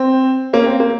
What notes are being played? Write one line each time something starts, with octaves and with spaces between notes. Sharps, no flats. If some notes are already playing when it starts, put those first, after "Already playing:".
Already playing: C4
A#3 C#4
C4
A#3